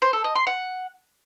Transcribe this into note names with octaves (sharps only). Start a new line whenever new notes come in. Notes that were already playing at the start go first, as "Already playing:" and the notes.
C5
A4
D#5
C6
F#5